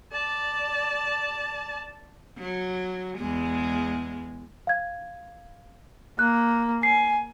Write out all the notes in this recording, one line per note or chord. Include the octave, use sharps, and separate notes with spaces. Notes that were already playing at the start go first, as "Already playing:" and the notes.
D5 A5
F#3
E2 G#3
F5 G#6
A#3 F#6
G#5 C7